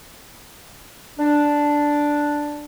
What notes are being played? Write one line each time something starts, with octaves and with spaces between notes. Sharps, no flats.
D4